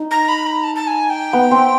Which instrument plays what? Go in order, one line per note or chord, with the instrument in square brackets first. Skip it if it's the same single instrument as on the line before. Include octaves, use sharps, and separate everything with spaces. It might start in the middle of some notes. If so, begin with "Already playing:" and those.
Already playing: [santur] D#4
[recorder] A#5
B5
A#5
A5
A5
G#5
G5
[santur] B3
C4